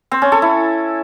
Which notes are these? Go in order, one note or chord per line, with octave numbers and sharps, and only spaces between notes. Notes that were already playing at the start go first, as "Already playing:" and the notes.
C4
C#4
A4
E4